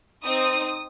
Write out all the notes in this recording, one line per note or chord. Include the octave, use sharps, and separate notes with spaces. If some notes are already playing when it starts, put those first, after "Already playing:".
C4 D#4 D#6